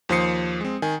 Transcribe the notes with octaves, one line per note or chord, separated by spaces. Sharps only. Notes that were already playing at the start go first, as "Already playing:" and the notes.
D#2 F3 C5 D#6 C7 C#7
G#3 C4
D#3 G#5